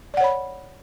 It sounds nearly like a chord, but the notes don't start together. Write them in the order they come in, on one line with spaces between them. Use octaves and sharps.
D5 F#5 C#5 B5